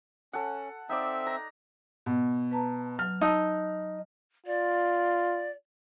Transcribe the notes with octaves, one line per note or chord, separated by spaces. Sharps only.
C#4 A4 F#5
C4 D#4 D5 E5
A#5
B2
B4 A5 A#5
F#3 F6
D#4 A5 E6
F4 D5